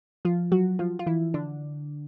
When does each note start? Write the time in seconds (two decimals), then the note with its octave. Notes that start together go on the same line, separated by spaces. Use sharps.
0.25 F3 F4
0.52 F#3 F#4
0.79 F3 F4
0.99 F4
1.06 E3 E4
1.34 D3 D4